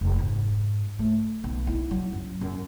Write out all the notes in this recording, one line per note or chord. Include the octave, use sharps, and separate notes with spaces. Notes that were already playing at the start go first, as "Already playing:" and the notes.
F1
G#2
A3
B1
E4
F#3
F#2
F#2